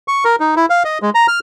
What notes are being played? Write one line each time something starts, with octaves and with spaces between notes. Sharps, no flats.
C#6
A#4
D#4
E4
F5
D#5
G#3
A#5
F6